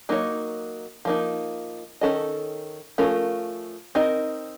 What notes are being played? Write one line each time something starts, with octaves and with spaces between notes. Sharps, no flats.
F#3 A#3 D#4 A4 C#5
F3 A#3 D#4
D#3 A#3 C#4 A4 D#5
F3 A3 C#4 F4 A#4
C4 D#4 A#4 D#5